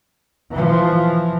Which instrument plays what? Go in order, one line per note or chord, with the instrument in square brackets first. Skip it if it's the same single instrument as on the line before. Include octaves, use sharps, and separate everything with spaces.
[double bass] E3 F3